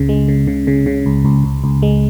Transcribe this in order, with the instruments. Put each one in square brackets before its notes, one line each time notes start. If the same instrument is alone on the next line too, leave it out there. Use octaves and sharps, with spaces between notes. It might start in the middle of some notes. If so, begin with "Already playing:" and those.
Already playing: [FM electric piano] C#2 C#3
G#3
C#3
C#3
C#3
C#3
C#2
C#2
C#2
C#2
G#3